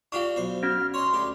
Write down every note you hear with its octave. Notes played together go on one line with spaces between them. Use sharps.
D4 F4 G4 F5 C#6
B1 C5
C#4 F#4 F6
C#5 D#5 C6
D2 G4